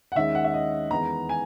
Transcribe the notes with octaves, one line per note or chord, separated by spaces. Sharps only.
F#5
D#2 D#3 G#3 C#4 E5
F#5
E5
D#5
E2 D#3 G#3 B3 A#5
G#5